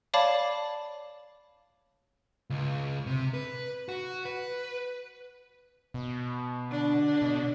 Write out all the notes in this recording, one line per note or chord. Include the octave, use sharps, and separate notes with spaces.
C#5 D5 F5 A5 B5 D6
C#2
C3
B4
F#4
B4
B2
D3 D4
B2